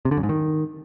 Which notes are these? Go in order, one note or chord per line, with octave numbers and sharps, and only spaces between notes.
C3
D3
F#2
G#2
D#3